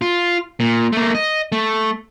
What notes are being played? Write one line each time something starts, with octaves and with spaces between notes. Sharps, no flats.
F4
A#2
A3 A#3
D#5
A3